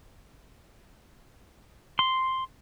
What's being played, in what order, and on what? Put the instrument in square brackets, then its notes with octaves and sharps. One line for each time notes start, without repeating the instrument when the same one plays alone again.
[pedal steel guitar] C6